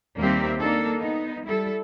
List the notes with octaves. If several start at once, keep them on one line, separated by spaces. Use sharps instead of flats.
D#2 G3 A#3 C4 G4 E5
A#3 D4 D#4 A4
B3 D#4
G3 E4 A4